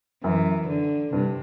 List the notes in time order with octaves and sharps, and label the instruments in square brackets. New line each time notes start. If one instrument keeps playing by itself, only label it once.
[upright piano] F#2 [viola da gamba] E3
[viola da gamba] D3
[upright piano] G2 [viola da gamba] C3